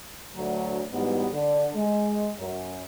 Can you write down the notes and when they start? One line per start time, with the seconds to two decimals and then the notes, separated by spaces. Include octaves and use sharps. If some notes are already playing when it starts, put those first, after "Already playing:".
0.34 D2 F#3
0.91 G#2 E3 F#3 G3 B3
1.32 D3
1.74 G#3
2.37 F#2